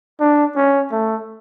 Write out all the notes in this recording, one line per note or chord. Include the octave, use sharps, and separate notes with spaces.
D4
C#4
A3